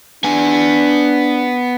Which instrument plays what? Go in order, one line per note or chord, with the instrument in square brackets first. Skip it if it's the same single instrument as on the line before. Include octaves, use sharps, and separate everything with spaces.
[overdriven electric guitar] B3 G#5 [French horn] D4